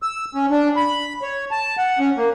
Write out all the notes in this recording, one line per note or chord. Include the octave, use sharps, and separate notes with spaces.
E6
C#4
D4
B5
C#5
A5
F#5
C#4
A#3